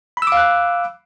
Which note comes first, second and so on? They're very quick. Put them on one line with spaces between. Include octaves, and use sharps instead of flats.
B5 E6 D6 F5 F#6